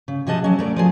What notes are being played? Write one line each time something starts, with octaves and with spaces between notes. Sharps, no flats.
C#3
C3 F3 G#4 D#5 F#5 A5
F#3 C#4
A3 A#4 D5
F3 F4 G#4